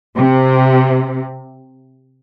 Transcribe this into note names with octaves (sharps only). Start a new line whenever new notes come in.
C3